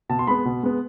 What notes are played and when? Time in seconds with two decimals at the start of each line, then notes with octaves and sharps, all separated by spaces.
0.09 B2 A5
0.19 C6
0.27 G#3 B3 B5
0.45 B2
0.63 G#3 B3